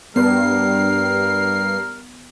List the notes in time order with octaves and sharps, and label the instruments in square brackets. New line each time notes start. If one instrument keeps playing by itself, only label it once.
[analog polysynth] G2 C7 [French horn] G3 [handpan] B3 [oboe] A#4